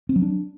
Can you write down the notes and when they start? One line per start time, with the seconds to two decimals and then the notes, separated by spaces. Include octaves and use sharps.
0.09 C4
0.16 F#3
0.22 D4